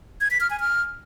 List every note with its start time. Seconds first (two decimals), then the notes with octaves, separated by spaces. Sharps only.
0.21 G#6
0.31 B6
0.40 F6
0.50 G#5
0.60 F6